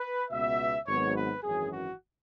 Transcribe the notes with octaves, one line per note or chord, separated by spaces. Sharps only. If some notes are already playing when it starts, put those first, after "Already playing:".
Already playing: B4
C#2 B2 B3 E5
G#1 G#2 F#3 B3 C#5
B4
G#1 F#2 E3 C#4 G#4
F#4